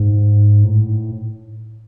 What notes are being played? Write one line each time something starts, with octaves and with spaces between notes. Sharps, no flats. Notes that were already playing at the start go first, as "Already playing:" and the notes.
Already playing: G#2
A2